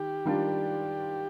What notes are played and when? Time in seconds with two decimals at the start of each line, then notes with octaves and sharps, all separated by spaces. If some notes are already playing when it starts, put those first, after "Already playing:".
Already playing: D#3 G4
0.25 D#3 G3 D4 F4